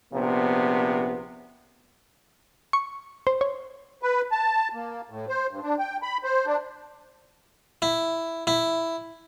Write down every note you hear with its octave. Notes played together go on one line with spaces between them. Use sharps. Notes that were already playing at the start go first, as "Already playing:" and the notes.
A#1 C3 B3
C#6
C5
C#5
B4
A5
A#3
A2
C5
G2
D4
G5
B5
C5
D4
E4
E4